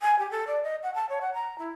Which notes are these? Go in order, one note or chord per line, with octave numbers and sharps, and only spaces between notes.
G#5
G4
A4
D5
D#5
F#5
A5
C#5
F#5
A#5
E4